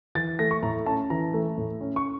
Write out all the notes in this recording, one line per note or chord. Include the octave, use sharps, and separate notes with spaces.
E3 A6
A3 A#6
C#6
A2 A#5
C#4 A5
E3 A#5
A3
A2
C#4
C#6